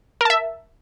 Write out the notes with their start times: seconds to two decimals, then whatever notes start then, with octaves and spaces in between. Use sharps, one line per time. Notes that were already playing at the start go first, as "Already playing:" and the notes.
0.21 A#4
0.25 A5
0.30 E5